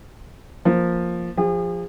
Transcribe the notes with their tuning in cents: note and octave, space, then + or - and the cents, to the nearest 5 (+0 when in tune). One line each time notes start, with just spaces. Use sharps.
F3 +0 A#3 +0
F3 +0 G#4 -45